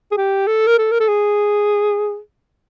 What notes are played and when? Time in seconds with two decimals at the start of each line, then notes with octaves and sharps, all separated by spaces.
0.11 G#4
0.17 G4
0.47 A4
0.67 A#4
0.78 A4
0.92 A#4
1.00 A4
1.08 G#4